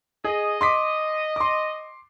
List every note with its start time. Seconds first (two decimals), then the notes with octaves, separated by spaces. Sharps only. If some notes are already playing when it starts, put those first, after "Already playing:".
0.24 G#4 D#5
0.61 C6 D6 B6
1.36 C6 D6